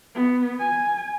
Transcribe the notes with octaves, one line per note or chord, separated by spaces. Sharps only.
B3
G#5